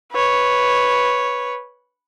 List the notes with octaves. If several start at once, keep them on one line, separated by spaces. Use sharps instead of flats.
B4 C#5